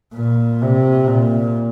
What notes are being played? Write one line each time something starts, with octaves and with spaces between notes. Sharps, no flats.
A#2
C3
A#2